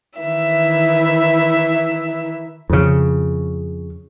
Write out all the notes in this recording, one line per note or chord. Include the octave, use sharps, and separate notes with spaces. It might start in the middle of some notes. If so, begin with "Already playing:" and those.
D#3 E3 E5
F2 C#3